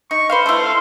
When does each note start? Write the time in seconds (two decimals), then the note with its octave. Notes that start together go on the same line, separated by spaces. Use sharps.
0.11 D#4 C#6
0.30 B4 C5 F5 C6
0.46 A3 E4
0.62 F5